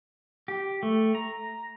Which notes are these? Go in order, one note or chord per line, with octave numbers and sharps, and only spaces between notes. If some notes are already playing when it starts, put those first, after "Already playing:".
G4
A3
A#5